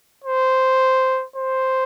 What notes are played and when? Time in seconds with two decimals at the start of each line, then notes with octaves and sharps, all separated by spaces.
0.25 C5
1.36 C5